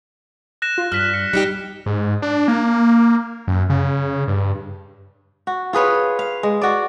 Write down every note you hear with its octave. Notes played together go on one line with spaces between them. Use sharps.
F#6 A#6 E7
F4
G2 F6 F#6 B6 E7
C#7
G3 D#4 G4 C#7
G#2
D4
A#3
F#2
C#3
G2
F#4
F4 G#4 B4 C#5
F5
G#3
F#4 D5